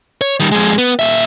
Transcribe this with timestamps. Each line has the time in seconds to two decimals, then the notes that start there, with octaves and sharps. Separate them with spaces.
0.21 C#5
0.40 D#3 G3
0.52 F2 G#3
0.78 B3
0.99 A#2 E5